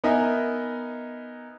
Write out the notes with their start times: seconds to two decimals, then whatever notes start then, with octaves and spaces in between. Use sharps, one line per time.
0.04 B3 D#4 A#4 D#5 E5 G#5